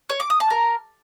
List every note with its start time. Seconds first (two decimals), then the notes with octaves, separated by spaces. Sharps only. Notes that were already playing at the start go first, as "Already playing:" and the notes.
0.10 C#5
0.20 D6
0.30 D#6
0.40 A5
0.50 A#4